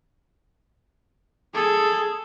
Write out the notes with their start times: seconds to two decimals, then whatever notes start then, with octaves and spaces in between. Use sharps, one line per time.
1.55 G#4 A4